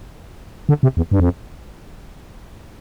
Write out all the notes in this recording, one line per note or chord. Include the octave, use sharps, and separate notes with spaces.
D3
C3
E2
G2
F2